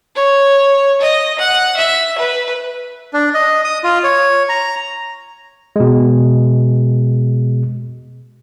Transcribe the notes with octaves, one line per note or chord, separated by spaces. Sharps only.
C#5
D#5
F#5
E5
B4
D4
D#5
D#6
F4
C#5
A#5
B2 G#3